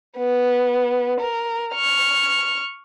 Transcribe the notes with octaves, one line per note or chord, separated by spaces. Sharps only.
B3
A#4
C#6 F6